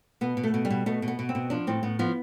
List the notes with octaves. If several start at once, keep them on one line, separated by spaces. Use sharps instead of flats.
B2 B3
B2
A3
B2
G3
B2
B2 A3
B2
B3
B2
C4
B2
F3 D4
A2 C4
A2 B3
F3 B3